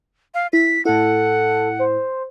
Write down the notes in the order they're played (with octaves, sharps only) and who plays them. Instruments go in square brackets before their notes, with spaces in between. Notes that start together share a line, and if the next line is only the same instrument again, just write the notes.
[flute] F5
[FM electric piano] E4 [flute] B6
[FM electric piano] A2 E4 [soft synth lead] A4 [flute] F#5
[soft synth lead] C5